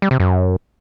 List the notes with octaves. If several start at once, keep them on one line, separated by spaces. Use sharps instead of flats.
G3
C3
F#2